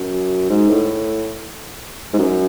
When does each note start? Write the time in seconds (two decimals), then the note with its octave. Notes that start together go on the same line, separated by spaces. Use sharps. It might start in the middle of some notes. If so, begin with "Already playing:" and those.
Already playing: F#2
0.49 G#2
0.70 A2
2.13 G#2
2.19 F#2